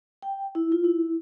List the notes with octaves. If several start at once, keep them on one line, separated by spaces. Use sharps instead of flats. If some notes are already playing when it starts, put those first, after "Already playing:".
G5
E4
F4
E4